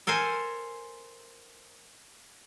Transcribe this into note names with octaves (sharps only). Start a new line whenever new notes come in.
A4 A#4 C5 G#5